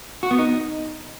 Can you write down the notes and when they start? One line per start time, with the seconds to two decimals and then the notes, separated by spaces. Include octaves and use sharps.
0.23 F#4
0.31 B3
0.39 D#4